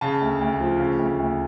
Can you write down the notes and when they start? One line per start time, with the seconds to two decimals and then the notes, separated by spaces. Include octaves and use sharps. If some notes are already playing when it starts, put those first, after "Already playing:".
0.01 C#3 A5
0.21 D2
0.41 D2
0.60 F3
0.80 C#3
0.99 D2
1.19 D2